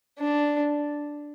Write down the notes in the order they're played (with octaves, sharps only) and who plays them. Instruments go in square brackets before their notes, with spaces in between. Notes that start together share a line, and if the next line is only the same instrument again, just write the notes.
[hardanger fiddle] D4